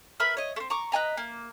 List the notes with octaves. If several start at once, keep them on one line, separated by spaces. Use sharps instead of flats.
A#4 B4 E5 B5
C#5 D#5
A3 C4
A#5 C#6 D6
B4 D#5 G#5 A#5
A#3